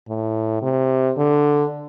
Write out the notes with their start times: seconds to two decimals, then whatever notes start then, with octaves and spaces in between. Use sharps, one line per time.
0.09 A2
0.62 C3
1.17 D3